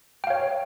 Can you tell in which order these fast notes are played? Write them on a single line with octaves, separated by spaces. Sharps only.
G5 F5 C#5